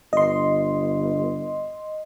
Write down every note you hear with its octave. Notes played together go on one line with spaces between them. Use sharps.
G1 D#5 C6